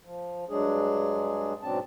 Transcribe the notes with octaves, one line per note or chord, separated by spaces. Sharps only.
F3
G2 F#3 G#3 D4 G#4
G#2 B2 F#3 C4 D4 A5